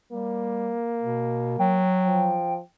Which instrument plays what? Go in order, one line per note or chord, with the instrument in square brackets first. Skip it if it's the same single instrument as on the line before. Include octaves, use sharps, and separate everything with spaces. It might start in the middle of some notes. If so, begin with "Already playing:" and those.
[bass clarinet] G3 [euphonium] A#3
[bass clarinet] B2
[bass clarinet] F#3 [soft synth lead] G5
[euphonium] F3